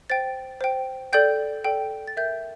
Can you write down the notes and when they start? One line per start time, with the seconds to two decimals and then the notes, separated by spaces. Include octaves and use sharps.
0.10 C5 G5 A6
0.61 C5 G5
1.13 A4 D5 G5 G6
1.65 A4 D5 G5
2.08 A6
2.16 A#4 E5 G5 G6